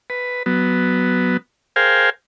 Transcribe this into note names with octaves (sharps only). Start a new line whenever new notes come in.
B4
F#3 B3
G#4 A#4 C5 F5 G5 G#5